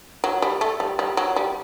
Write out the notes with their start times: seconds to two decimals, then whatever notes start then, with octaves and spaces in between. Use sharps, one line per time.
0.24 F#3
0.42 G3
0.61 A3
0.80 G3
0.99 G3
1.17 F#3
1.36 G3